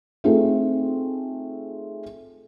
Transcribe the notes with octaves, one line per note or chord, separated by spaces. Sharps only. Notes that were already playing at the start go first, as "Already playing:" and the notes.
A3 C4 D#4 F4 G#4 A4